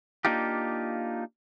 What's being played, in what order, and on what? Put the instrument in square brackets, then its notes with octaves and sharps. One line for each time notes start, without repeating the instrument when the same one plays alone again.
[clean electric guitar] A#3 D4 D#4 F4 G4